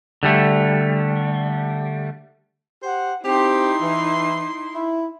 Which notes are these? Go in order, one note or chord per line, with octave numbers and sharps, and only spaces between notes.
D3 G3 A3
G4 C5 F#5
C4 D#4 E4 G4 C6
E3
E4